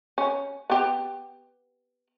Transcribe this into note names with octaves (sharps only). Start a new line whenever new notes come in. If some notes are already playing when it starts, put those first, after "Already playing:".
C#4
B3 G4